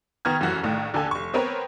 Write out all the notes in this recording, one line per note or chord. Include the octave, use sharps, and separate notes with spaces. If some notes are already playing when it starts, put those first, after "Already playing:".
D#3 B3 A#5 F6 G#6
F1 F#2 E3 F#4 F#6
A#1 A2 D#3
D#2 D3 G4 A4 G#5
F1 C#6
B3 C4 A#4 B4 C#5